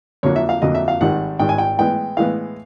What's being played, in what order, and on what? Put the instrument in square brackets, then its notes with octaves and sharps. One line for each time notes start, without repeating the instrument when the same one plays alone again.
[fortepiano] F2 D3 F#3 A#3 C#5
E5
F5
F2 D3 F#3 A#3 D#5
E5
F5
G#1 G#2 D#3 G3 F#5
G#1 G#2 D#3 G3 G5
G#5
G5
A2 E3 G#3 B3 G5
A2 E3 G#3 B3 F5